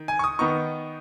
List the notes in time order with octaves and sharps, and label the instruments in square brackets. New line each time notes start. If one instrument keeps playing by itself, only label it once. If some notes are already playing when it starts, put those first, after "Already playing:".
Already playing: [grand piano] D#3
G#5
C#6
D#6
D#3 B3 D#4 C#6